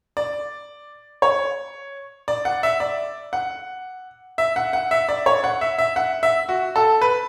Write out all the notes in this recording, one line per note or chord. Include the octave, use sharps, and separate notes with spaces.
D5
C#5
D5
F#5
E5
D5
F#5
E5
F#5
F#5
E5
D5
C#5
F#5
E5
E5
F#5
E5
F#4
A4
B4